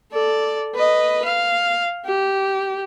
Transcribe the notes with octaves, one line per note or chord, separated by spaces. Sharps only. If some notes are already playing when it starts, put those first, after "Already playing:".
A4 D5
B4 D#5
F5
G4